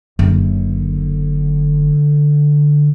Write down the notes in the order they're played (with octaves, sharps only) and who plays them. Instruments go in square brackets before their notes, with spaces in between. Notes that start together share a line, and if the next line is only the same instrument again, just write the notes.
[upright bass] F#1 [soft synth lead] D3